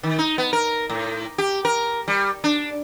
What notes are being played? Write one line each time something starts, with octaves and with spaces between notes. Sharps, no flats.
D#3
D#4
B3
A#4
A2
G4
A#4
G3
D4